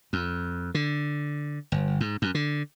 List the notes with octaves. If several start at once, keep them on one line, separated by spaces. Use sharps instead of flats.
F2
D3
G1
G#2
F#2
D3